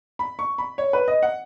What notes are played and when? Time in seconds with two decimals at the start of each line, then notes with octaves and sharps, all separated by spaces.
0.19 B5
0.39 C#6
0.58 B5
0.78 C#5
0.93 B4
1.08 D#5
1.23 F#5